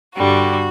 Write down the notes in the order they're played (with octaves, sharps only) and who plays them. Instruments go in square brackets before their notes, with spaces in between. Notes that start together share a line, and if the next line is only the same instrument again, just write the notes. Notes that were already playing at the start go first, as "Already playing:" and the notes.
[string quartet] G2 D3 G3 F#4